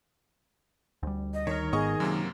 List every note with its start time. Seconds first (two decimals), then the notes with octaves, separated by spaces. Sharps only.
1.03 D2 G3
1.34 D#5
1.47 D#3 A#4 C#5
1.73 G#1 G#2 B3 G#4 D#5 C#6 D#6
2.00 F#2 C3 F#3 A#3